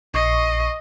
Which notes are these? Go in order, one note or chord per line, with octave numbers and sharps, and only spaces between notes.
A#1 D#5 C#6 C7